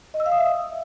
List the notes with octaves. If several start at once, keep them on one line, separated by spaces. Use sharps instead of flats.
D#5
E6
F5
D#6
E5